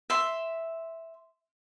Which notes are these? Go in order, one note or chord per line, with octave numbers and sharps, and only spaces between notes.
E5 C6